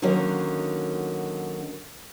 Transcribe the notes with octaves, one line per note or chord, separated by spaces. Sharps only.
D3 D#3 F#3 A#3 C#4 D#4